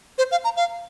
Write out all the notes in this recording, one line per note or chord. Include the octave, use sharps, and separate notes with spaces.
C5
F5
A#5
F5